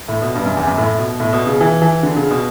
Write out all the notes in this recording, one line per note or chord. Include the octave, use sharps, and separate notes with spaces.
A2
B2
G2
F#2
E2
F#2
A2
B2
A2
B2
C#3
E3
E3
D3
C#3
B2